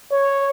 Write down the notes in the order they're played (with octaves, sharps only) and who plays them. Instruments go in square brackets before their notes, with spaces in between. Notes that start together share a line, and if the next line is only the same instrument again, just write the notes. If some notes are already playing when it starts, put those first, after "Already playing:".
[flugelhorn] C#5